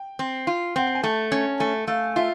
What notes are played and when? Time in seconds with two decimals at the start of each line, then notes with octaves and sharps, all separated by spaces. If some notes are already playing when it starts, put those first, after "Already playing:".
Already playing: G5
0.19 C4
0.47 F4
0.76 C4 F#5
0.87 G5
0.95 G#5
1.03 A3 A5
1.32 C#4
1.60 A3 G#5
1.87 A3 F5
2.16 F4 E5